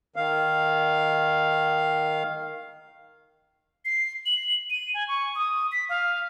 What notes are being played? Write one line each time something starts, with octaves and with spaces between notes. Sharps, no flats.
D#3 F5
C7
F#7
D#7
G#5
C#6
D#6
B6
F5